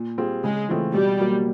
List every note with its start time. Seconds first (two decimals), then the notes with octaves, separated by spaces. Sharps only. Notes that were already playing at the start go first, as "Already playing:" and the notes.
Already playing: A#2
0.18 G3 C4 F4 G#4
0.44 C#3 G#3
0.69 E3 A3 C4 F4
0.94 B2 G3
1.19 F#3 A#3